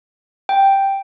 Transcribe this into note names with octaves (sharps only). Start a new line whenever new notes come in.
G5